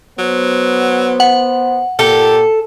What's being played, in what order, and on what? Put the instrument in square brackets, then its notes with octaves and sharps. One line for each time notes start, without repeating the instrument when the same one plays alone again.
[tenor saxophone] F#3 [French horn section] B3 C5
[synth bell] F#5
[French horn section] A#2 [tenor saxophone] G4 [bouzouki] A4